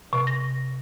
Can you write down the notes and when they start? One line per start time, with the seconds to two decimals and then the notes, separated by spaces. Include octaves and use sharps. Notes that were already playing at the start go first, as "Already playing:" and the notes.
0.13 C3
0.27 A#6